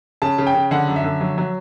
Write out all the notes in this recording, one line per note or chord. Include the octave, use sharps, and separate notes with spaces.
C#3 A5
C#3
G5
C#3
D3 F#5
F#2
E5
D3
F#3
F#3